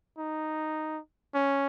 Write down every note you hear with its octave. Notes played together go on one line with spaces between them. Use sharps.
D#4
C#4